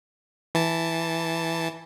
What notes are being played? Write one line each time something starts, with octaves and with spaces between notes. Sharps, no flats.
E3 A5